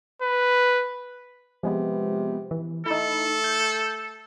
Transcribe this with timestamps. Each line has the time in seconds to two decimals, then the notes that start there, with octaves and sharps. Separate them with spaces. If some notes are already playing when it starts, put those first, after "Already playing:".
0.22 B4
1.63 C3 F3 G#3 B3
2.51 E3
2.86 A3 D#4 E4 A4
3.44 G6